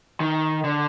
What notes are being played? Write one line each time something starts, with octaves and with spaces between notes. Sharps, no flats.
D#3
D3